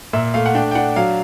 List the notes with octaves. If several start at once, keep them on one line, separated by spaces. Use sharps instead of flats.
A#2 E5
A3 F5
F#5
D4 G5
G5
D4 F#5
F#3 F5